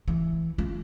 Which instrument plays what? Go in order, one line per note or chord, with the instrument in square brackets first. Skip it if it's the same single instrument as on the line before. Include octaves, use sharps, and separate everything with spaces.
[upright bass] E3
F4